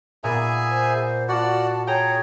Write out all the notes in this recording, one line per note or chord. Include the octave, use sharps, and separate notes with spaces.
A#2 B3 G#4 D5 E5 G#5 A#5
C5
F4 F#4 D5 F#5 A5
G#4 C#5 G5 A#5